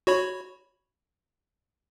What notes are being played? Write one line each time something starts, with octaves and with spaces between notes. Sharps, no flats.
F#4 C#5 B5